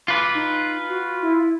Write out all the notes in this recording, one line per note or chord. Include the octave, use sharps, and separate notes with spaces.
F4 B4 D6
D#4
F#4
E4